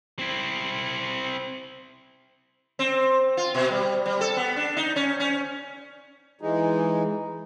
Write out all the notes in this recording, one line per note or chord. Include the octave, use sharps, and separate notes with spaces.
C4 E4
C4
F4
B2
G3
G3
A4
B3
D4
D#4
C#4
C#4
E3 G#3 D#4